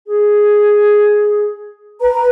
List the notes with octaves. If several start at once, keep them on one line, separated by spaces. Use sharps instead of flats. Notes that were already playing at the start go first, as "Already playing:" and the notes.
G#4
B4 A#5